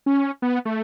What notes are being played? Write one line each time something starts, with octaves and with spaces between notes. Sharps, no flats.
C#4
B3
A3